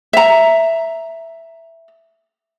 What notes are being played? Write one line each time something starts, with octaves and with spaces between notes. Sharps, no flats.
E5 A#5